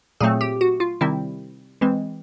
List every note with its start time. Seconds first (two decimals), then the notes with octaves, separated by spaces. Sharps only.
0.20 A#2 F#3 A3 C4 G#4
0.41 G4
0.61 F#4
0.80 F4
1.01 C3 D#3 G3 C4 E4
1.81 E3 G#3 C4